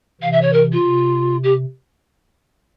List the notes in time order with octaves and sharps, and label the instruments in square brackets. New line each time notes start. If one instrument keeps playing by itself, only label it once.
[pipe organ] C3 E3 [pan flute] F5
[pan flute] E5
C#5
A#4
F4
[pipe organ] C3
[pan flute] G4